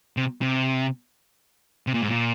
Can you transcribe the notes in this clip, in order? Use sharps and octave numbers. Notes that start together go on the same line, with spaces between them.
C3
C3
C3
A#2
G#2
A#2